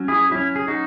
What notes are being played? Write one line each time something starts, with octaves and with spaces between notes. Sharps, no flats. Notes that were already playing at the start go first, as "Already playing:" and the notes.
Already playing: F#3 C#4
E4 G#4
F#3 C#4 E4
G#4
D#4 F#4